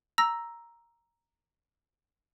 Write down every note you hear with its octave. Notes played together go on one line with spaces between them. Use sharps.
A#5 E6 A#6